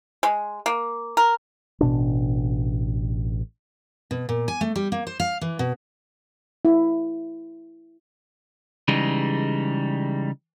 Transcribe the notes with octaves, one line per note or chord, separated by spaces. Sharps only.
G#3
A#3
A#4
A1 B2 D4
B2
A#2
G#5
A3
G3
A#3
C5
F5
E3
B2
E4
C#3 E3 G3 G#3 D#4